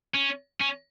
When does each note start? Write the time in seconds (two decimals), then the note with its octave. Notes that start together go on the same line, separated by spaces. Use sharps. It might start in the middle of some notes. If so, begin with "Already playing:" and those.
0.15 C#4
0.61 C#4